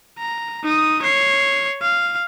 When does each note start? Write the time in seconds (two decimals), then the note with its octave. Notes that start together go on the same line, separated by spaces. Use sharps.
0.19 A#5
0.64 D#4 D#6
1.02 C#5 C7
1.81 F5